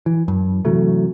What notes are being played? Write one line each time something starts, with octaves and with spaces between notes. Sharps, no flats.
E3
F#2
C3 E3 F#3 A3